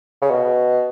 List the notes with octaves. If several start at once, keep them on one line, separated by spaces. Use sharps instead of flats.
C#3
B2